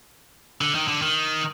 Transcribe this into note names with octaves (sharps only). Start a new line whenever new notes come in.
D3
D#3
D3
D#3